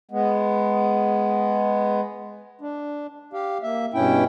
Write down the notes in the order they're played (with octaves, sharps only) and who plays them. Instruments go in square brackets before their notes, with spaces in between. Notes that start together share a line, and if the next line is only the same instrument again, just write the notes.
[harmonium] G#3 B3
D4
G4 F5
A#3 E5
G2 B2 C#4 E4 G5